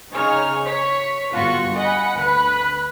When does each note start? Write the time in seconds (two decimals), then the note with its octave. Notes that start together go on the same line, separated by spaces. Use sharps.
0.14 C#3 D#4 G#4 C#5 F6
0.66 C#5 B6
1.32 G1 F4 F#4 C#6
1.73 D#5 F#5 G#5 B5
2.17 D2 B4 B5 F#6